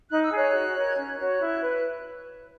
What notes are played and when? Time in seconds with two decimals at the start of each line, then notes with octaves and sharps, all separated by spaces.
0.10 D#4 F#6
0.23 E6
0.31 G#4 C#5 F#6
0.54 F#4
0.75 A#4 C#5
0.86 G#6
0.96 C#4 F#6
1.19 F#4 C#5
1.40 E4
1.62 B4